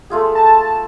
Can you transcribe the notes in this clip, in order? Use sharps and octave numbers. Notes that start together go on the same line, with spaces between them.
A3 F4 G#4
A5